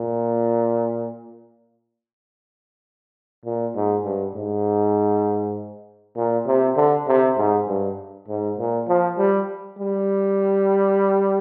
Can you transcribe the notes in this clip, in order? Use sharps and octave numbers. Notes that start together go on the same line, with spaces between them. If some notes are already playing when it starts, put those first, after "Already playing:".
Already playing: A#2
A#2
G#2
G2
G#2
A#2
C3
D3
C3
G#2
G2
G#2
A#2
F3
G3
G3